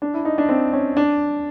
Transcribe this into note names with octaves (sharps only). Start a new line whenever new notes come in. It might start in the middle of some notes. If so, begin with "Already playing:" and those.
D4
E4
D#4
D4
C4
C#4
D4